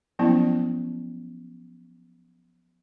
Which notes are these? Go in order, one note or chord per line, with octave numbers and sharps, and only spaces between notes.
F3 F#3 A#3 B3 C#4 E4